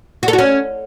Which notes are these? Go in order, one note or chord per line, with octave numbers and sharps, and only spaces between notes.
F#4
A4
F#4
C#4